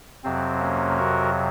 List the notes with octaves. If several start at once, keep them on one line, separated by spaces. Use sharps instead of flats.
F2 C3 F#3 C4
A#3 C#4
F#4 A#4